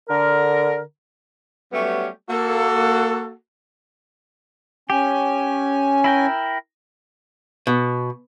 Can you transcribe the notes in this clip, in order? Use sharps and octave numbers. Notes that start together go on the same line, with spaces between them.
D3 A#4
F#3 G3 A3 B3 C#4 G4
A#3 F#4 A4
C#4 G4 G#5
E4 A#4 G5
B2